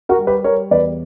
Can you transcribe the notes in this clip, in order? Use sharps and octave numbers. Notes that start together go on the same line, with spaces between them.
F#4 A#4
G3
G4 B4
G3 A#4 C#5
E2 B4 D5